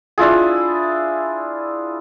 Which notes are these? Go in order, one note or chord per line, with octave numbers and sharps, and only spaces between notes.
D4 E4 F4 G#4